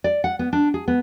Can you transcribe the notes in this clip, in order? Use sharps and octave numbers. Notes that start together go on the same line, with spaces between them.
D5
F#5
B3
D4
G#4
B3